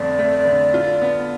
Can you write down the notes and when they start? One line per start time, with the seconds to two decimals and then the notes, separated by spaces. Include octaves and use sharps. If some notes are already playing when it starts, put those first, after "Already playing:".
Already playing: G1 F2 D3 A3 D5
0.18 A3
0.46 D3
0.74 F4
1.01 B3